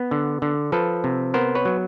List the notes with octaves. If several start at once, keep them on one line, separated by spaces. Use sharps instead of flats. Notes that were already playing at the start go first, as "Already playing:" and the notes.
Already playing: B3
D3
D3
F3 A4 B4
C3
B3 A#4 C5
B4 C#5
F#3